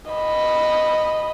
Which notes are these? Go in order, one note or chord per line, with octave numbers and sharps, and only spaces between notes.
D#5 B5